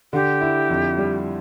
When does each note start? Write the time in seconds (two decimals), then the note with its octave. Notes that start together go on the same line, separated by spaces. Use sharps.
0.13 D3 G4
0.41 E4
0.70 F2
0.98 G3